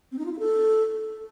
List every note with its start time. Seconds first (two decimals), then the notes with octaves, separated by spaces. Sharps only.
0.12 C4
0.19 D#4
0.26 F4
0.32 E4
0.39 A4